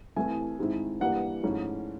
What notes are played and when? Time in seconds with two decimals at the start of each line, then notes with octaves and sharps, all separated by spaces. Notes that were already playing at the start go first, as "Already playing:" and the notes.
0.16 C2 C3 E3 A3 G#5
0.59 G#2 D#3 G#3 C4 E4
1.00 G2 E3 G3 A#3 F#5
1.43 G#2 F3 A3 C#4 E4